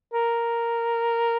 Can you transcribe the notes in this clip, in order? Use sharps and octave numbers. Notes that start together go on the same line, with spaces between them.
A#4